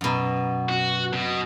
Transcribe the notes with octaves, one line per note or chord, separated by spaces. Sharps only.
F#2 B2
F#4
B2